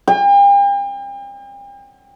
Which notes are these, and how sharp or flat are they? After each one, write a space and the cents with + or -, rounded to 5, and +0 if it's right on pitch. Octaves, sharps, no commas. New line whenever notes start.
G5 +40